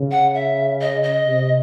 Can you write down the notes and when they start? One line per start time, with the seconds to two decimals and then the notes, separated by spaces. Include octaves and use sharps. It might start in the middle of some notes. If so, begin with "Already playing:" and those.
Already playing: C#3
0.11 F#5
0.35 E5
0.81 D#5
1.03 D#5
1.26 C3